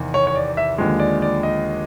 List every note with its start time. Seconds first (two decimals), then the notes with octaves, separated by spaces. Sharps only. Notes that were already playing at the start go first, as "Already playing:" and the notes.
Already playing: E2 C3 D#3
0.14 C#5
0.27 C#5
0.36 D5
0.57 E5
0.78 D#2 D3 F3 G#3
1.00 D5
1.22 D5
1.43 D#5